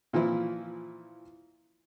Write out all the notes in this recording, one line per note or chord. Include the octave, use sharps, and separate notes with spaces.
A#2 E3 F3 E4